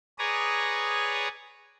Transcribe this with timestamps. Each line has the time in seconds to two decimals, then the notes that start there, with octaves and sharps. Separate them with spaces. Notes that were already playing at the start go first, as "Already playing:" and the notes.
0.19 G#4 B4 C#5 D5 A#5 D#6